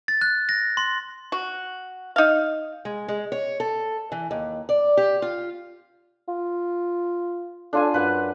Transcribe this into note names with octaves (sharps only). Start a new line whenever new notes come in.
A6
F#6
A#6
C6
F#4
D#4 F5
G#3
G#3
C#5
A4
E3
D#2
D5
G4
F4
F4
D4 F4 A4 G#5
F#2 B4 F#5 A5